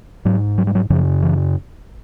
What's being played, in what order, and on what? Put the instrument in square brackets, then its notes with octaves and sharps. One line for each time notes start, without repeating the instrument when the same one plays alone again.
[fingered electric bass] G#2 F#3
F#3
G3
F#3
F#2 C#3 F3
E3